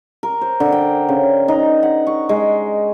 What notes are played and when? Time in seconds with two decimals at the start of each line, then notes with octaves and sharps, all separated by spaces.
0.23 A#4
0.41 C5
0.60 D3
0.72 G5
1.09 C#3
1.48 D#4
1.83 F#5
2.07 C#6
2.29 G#3